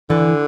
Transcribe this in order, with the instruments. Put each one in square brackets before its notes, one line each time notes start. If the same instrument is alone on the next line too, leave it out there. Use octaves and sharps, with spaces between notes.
[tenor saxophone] D3 [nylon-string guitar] E3